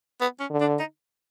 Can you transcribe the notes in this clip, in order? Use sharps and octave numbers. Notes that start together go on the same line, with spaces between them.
B3
C#4
D3
D4
D#4